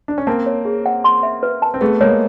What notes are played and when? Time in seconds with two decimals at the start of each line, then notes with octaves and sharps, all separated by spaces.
0.08 D4
0.18 C#4
0.27 A#3 C4 A5
0.46 C#5
0.65 G#4
0.86 F#5
1.04 C6
1.23 E5
1.43 B4
1.62 A5
1.74 C4
1.81 A3 B3 G#4
2.00 G#3 A#3 C#5